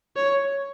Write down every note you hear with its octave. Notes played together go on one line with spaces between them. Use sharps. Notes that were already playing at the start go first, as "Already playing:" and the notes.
C#5